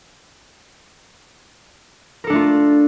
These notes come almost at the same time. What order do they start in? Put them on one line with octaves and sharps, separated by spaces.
A#4 A4 D4 A3 F4